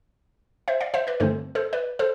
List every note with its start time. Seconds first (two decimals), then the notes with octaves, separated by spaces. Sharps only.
0.68 C5 E5
0.81 D5 F5
0.94 C5 E5
1.07 B4 D5
1.20 G2 D3 A3 C4 A4 C5
1.55 A4 C5
1.73 B4 D5
1.99 A4 C5